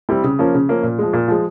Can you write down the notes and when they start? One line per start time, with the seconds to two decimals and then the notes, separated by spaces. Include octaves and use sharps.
0.09 G3 C4 E4
0.24 C#3
0.39 F3 A#3 C#4
0.54 C#3
0.69 F3 A#3 C#4
0.83 A#2
0.99 F3 G#3
1.13 A#2
1.28 F3 G#3